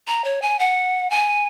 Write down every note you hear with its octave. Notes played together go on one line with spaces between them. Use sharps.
A#5
C#5
G#5
F#5
G#5